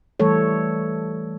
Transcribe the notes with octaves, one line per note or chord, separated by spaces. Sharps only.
E3 G3 A3 A4 C#5